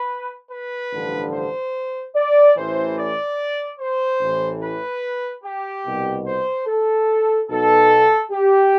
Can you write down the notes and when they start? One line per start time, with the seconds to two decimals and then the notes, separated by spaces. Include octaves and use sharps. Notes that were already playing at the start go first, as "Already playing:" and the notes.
Already playing: B4
0.51 B4
0.92 A1 G2 D3 F3
1.34 C5
2.16 D5
2.57 A1 A2 E3 C5
2.98 D5
3.80 C5
4.21 A1 A2 E3
4.63 B4
5.44 G4
5.86 C2 B2
6.27 C5
6.67 A4
7.50 B1 B2 A4
8.32 G4